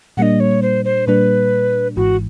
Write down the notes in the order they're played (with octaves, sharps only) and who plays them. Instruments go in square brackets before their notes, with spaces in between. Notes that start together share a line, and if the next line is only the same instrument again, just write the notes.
[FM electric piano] A#2 G3 A#3 D4 [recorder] D#5 F#5
[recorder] C#5
C5
C5
[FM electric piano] A#2 G3 A#3 D4 [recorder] B4
[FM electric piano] G#1 G#2 E3 [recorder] F#4